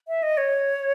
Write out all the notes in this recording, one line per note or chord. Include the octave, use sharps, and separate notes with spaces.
E5
D#5
C#5